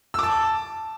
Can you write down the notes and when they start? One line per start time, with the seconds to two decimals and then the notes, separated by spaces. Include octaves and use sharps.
0.14 E6
0.19 D6
0.23 A5